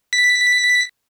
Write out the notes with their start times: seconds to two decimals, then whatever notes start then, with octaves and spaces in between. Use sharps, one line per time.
0.13 B6